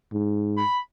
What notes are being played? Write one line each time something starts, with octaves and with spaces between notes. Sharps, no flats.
G#2
B5